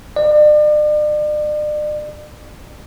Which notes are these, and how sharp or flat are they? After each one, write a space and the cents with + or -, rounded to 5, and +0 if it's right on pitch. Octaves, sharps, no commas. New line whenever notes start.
D5 +40